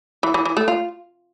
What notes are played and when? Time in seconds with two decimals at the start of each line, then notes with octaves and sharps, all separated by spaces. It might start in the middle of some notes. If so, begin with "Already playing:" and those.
0.23 E3
0.34 E3
0.45 E3
0.57 A3
0.68 F4